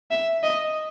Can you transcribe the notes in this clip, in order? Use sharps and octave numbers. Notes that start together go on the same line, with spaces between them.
E5
D#5